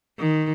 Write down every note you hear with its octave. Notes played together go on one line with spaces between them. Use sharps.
D#3